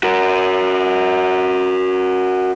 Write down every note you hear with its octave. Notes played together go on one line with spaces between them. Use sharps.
F#4 A#4